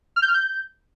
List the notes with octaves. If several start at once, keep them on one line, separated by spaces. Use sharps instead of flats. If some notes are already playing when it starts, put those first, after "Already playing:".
F6
G6
F6
G6